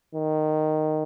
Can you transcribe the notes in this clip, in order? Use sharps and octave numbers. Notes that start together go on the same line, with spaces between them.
D#3